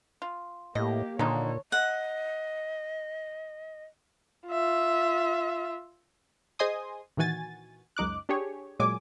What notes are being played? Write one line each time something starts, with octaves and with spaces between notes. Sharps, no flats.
F4
A2 A#3 G4 D#5
A#2 D3 D#3 G#3 D#4 C#5
D#5 F#5
F4 E5
G#4 C5 D#5 G#5 C6 D#6
A#2 D#3 E3 F#4 G#5 A6
C#2 F#2 D#4 D6 F#6
D4 G4 G#4 C#5
A#2 F#3 G#3 G#5 D6